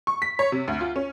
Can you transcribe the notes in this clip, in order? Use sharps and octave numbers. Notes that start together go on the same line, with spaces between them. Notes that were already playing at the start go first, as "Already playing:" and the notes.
C#6
B6
C#5
C3
D2
F4
C#4